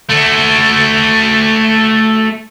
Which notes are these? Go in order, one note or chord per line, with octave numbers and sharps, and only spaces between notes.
A3 F#4